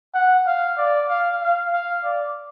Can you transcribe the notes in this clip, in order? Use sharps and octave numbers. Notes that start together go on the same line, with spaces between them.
F#5
F5
D5
F5
F5
F5
D5